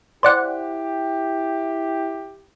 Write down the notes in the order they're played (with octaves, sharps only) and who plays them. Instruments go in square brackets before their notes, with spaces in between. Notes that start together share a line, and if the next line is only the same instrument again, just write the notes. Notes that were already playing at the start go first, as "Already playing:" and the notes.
[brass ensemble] E4 G4 [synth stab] C5 D5 F#5